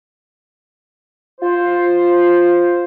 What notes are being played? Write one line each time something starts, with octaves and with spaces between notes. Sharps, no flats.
F4 C5